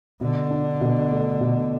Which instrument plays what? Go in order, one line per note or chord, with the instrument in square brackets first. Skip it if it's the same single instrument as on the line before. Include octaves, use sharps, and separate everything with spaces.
[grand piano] B2 [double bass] D3
[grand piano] D4
B2
A3
B2